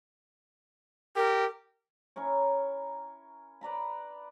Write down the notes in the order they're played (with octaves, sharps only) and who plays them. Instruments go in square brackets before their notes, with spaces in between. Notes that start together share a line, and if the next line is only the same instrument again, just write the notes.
[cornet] G4 [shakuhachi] A#4
[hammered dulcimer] C#4 E4 A#4 C#5
B4 D5 A#5 B5